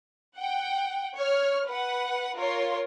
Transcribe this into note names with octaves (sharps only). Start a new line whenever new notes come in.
F#5 G5
C#5 F6
B4 F#5
F4 A#4 C#5 C6